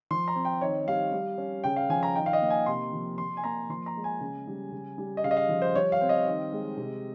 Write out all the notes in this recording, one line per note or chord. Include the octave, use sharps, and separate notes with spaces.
F3 C6
A#5
C4
G5
D#3 C#5
G3 F5
G3
C#4
C#3 G5
F5
F3 G#5
A#5
D#3 G5
F5
D#5
A#3
G#5
C3 C6
F3
F3 C6
G#5
A#3 A#5
F3 C6
A#5
G#3
G#5
C#3
G3
C#3
G3
D#5
C#3 F5
D#5
F5
F3
C5
G3 C#5
F5
C4
D#5
D#3
G#3
C3